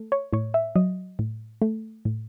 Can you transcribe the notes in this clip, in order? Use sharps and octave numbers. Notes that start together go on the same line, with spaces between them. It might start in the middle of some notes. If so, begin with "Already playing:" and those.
Already playing: A3
C#5
A2 C#5
E5
F#3 D#5
A2
A3
A2